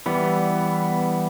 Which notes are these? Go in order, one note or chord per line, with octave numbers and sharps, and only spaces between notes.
E3 G3 B3